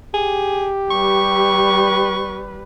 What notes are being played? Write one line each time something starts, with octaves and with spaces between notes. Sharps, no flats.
G4 G#4
G3 B4 C#6